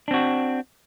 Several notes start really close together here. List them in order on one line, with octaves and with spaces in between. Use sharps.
D4 C4 F#4